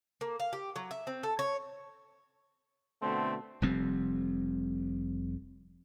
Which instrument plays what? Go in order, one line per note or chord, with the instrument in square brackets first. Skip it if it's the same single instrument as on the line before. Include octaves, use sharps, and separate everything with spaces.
[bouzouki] A#3
F5
G4
F#3
E5
C4
A4
C#5
[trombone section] B2 D3 A3 [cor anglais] C4
[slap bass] F1 F2 G3 C4